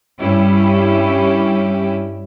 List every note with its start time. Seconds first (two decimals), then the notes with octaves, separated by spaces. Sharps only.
0.21 G2 G3 C#4 E4 G4